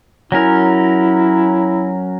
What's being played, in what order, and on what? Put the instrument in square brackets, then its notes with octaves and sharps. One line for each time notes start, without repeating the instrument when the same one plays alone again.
[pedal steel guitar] F#3 C#4 A#4 [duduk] E4